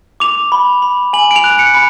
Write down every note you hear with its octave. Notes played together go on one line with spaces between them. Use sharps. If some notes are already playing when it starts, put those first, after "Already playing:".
D6 F7
B5
B5
G#5 F#7
D7
F7
F#6
C#7
B5